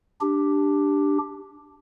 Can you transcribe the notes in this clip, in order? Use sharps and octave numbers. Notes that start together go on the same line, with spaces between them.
D4 G4